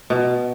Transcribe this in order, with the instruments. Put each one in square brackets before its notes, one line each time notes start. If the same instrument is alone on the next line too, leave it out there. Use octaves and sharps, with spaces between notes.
[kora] B2